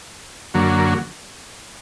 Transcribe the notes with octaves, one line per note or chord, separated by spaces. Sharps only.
F#2 D3 F#3 A#3